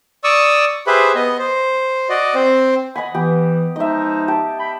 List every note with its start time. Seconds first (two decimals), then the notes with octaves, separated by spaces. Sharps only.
0.24 D5 C#6 D#6 E6
0.87 G4 G#4 B4 C5 E5 B5
1.15 B3 D#5
1.39 C5
2.09 F#4 D5 D#5
2.35 C4 C5
2.95 D#5 F#5 G#5 B5
3.14 E3 B3 G4
3.76 F3 G#3 D#4 D#5 E5
4.28 G4 A5
4.59 G5 B5